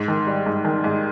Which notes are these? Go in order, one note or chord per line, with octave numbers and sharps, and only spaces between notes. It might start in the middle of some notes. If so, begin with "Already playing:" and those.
Already playing: G#2
D#3
G3
G#2
D#3
G#2